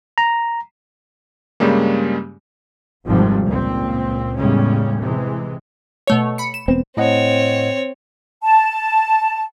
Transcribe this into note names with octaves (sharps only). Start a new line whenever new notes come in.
A#5
G2 C#3 G3 G#3 A#3
G#1 F2 G#2 C3 F3 G3
C#2 A#2 C4
E2 A2 C#3 G3 G#3 C#4
C3 E3 G#3
B2 A3 C#5
B5 C#7
E7
E1 B3 C4
A2 C4 C#5 D#5 F#5
A5